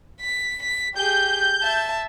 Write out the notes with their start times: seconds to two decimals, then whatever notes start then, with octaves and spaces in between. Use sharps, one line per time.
0.21 B6
0.62 B6
0.95 G4 G#4 G6
1.62 E5 A5